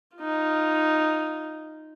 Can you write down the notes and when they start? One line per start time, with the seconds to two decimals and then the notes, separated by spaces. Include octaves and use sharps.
0.18 D#4 F4